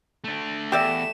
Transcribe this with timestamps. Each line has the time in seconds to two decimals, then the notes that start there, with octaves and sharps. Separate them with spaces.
0.24 A3 D4
0.72 E2 A3 G4 D5 E5 E7